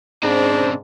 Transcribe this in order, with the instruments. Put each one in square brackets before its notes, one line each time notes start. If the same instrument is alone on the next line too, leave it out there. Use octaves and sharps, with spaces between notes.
[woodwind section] G#2 [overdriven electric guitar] C#3 C4 [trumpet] D4